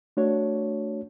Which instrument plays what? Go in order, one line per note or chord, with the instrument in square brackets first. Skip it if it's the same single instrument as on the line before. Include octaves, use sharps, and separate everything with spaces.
[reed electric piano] A3 D4 F#4 C#5